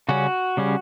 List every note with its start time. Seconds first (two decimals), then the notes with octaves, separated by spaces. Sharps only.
0.09 C#3 G3 C#4 F#4
0.57 C#3 G3 C#4